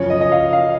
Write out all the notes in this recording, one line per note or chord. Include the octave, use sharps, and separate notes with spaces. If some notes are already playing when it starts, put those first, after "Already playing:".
Already playing: F#2 C#3 F3 C#5
D#5
D#5
F5
F5